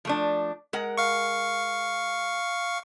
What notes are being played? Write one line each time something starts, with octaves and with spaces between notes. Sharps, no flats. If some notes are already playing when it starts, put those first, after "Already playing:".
F3 A3 D4
G#3 A#4 F#5
F5 C#6